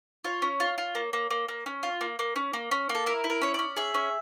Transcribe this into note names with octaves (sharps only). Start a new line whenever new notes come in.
F4 C#5
C#4
F4
F4
A#3
A#3
A#3
A#3
C#4
F4
A#3
A#3
C#4
A#3
C#4
A#3
A4
E4 A#4
E4
A#4
C#4 C#5
C#4 D5
G#4 E5
C#4